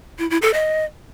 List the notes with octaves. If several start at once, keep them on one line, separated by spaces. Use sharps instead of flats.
E4
E4
A4
D#5